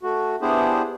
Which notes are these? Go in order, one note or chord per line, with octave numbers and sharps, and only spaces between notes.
A3 F#4
B3 D4 E4 G4 G#4 C5